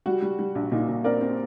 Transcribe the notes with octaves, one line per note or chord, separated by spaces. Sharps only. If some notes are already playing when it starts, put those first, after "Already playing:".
G3 F#4
G3
G3
A#1
A#2 D#4
A#2
C4 A#4 D5
C4